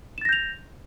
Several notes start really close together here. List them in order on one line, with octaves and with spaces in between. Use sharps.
E7 A6 A#6 G6 F7